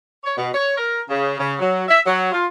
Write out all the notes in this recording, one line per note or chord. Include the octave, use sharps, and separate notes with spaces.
C#5
B2
C#5
A#4
C#3
C#3
F#3
E5
F#3
F4